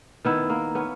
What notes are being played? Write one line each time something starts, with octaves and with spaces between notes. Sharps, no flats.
D#3 B3 E4
A#3
B3 C#4